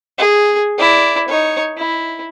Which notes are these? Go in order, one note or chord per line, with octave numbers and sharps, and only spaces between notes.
G#4
E4 D5
D#4 C#5
E4